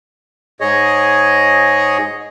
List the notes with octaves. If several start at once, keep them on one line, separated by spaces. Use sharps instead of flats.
G#2 G#4 C#5 D#5